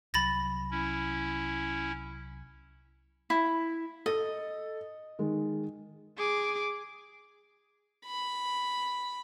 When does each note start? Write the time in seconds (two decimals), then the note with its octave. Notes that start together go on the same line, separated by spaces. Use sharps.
0.14 C2 F#3 B5 A6 A#6
0.71 C#4 E4
3.30 E4
4.06 A4 D#5
5.19 D#3 G#3
6.18 G#4 D6
8.06 B5